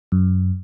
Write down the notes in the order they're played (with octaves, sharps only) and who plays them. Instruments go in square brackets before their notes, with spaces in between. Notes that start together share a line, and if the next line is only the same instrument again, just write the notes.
[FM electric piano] F#2